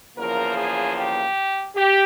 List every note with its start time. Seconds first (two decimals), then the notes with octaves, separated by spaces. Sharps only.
0.17 E2 C#3 F3 A#3 A#4
0.57 G#4
0.96 G4
1.75 G4